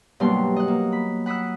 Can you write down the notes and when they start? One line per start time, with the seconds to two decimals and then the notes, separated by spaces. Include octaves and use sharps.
0.20 G2 B2 F#3 G3 A#3 C6
0.56 D#5 F#5
0.68 A#3
0.92 B5
1.26 F#5 B5 D#6 E6 F#6